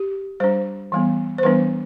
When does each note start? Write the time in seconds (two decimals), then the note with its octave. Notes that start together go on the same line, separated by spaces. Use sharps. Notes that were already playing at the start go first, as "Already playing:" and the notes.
Already playing: G4
0.40 G3 D4 C5
0.92 E3 G3 B3
1.38 C5
1.43 E3 G3 B3 D4 B4